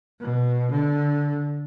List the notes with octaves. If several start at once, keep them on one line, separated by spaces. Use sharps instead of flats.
B2
D3